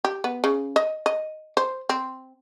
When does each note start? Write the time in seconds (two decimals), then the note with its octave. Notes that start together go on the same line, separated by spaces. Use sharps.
0.04 G4
0.24 B3
0.44 C#3
0.76 D#5
1.06 D#5
1.57 C5
1.89 C4